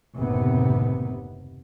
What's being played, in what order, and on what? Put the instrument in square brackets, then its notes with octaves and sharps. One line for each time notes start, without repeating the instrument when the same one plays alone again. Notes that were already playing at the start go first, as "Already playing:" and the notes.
[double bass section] F#1 D#2 A2 C3 B3